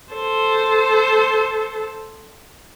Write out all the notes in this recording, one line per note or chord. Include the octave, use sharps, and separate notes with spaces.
A4 C5